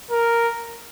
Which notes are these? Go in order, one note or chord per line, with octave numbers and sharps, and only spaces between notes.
A#4